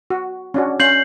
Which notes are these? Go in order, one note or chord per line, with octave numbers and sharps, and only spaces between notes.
F#4
C#4 D4 F#4
C#4 G6 C7 F#7